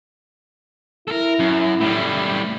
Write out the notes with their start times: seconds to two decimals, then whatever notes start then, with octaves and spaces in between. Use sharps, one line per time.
1.08 E4 A4 A#4
1.40 F#2
1.81 A2 G3